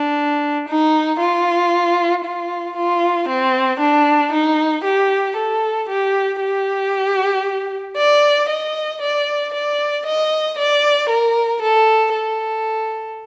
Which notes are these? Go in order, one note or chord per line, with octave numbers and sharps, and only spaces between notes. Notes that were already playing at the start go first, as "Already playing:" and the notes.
Already playing: D4
D#4
F4
F4
F4
C4
D4
D#4
G4
A4
G4
G4
D5
D#5
D5
D5
D#5
D5
A#4
A4
A4